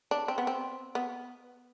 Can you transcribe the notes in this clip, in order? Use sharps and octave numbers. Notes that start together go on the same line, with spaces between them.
D4
C4
B3
C4
B3